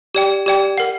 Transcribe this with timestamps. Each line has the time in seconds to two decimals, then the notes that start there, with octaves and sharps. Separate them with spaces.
0.15 G4 D5 G5
0.46 G4 D5 G5
0.78 A#4 F#5